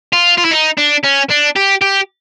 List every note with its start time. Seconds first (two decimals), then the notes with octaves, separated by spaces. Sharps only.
0.13 F4
0.38 F4
0.45 E4
0.52 D#4
0.78 D4
1.04 C#4
1.31 D4
1.56 G4
1.82 G4